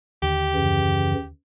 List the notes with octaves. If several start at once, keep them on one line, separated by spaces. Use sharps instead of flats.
D#2 D3 G4
F#2 C#3 E3